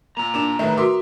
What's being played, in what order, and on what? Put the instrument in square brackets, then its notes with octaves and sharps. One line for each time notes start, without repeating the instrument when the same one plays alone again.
[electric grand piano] A#2 A#3 [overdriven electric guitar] A#5
[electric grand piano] A#2 A#3 D6 [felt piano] D4 E7
[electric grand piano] A1 D#3 A3 [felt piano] B4 E5
[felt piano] F#4 A#4 D6 [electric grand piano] E5 C6 D#6